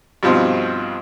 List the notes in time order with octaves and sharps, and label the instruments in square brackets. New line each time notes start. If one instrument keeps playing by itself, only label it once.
[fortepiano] G2 B2 F3 C4 D#4 F4